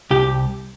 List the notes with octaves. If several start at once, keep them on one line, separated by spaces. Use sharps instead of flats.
C2 G4